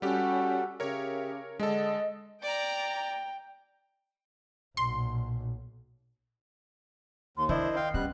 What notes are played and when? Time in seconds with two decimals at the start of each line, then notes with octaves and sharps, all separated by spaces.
0.02 G3 C#4 F#4 G4 A4 F#5
0.80 C#3 G4 A#4 C#5 E5
1.60 D3 G#3 D4 A4 D#5
2.43 D5 G5 A#5
4.77 B1 A#2 C6
7.37 D#2 C6
7.49 D#3 D4 E4 C5 D#5
7.76 F5 G5 C6
7.94 G3 B3 C#4 F#6